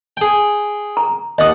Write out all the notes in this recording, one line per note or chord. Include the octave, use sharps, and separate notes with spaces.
G#4 G5
A#5
D#2 D#5 F#5 D#6